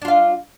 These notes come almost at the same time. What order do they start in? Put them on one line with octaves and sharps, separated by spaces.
D4 F4 F5